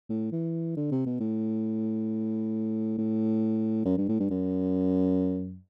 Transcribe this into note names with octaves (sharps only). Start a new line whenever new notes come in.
A2
E3
D3
C3
B2
A2
A2
F#2
G2
A2
G2
F#2